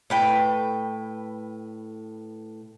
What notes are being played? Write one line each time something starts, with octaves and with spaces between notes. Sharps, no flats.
A2 B4 G5